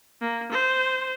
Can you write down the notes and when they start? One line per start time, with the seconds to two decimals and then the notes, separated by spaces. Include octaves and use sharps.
0.21 A#3
0.52 C5